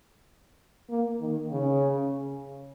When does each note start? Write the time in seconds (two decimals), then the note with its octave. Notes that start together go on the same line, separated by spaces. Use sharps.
0.90 A#3
1.21 D#3
1.52 C#3